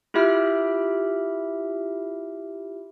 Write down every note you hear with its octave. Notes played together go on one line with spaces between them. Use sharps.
E4 F4 G4 E5 B5 F6